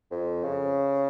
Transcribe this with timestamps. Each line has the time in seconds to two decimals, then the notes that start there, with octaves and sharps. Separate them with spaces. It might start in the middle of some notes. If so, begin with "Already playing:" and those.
0.11 F2
0.44 C#3